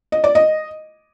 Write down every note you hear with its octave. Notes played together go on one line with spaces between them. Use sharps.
D#5
D5
D#5